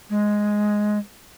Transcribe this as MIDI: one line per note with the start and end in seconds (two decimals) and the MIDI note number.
0.10 0.98 56